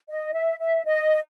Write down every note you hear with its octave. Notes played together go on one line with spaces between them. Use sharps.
D#5
E5
E5
D#5